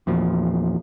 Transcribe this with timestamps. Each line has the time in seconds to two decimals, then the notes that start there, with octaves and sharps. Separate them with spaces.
0.07 E2 A#2 F3